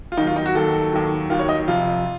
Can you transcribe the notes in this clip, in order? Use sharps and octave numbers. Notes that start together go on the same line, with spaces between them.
F4
D#2 D#3 F#3 D#4
F4
D#4
F#4
D#2 D#3 F#3 A4
D#2 D#3 F#3
D#2 D#3 F#3 F4
C#5
D#5
F2 C3 F3 F4